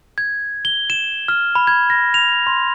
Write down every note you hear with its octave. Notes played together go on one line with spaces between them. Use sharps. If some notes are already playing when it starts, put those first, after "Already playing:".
G#6
G7
E7
F6
B5
G#6
A#6
F7
C6